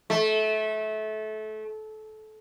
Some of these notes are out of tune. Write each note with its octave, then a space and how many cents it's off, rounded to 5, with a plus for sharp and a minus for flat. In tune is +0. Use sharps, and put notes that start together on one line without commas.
A3 -25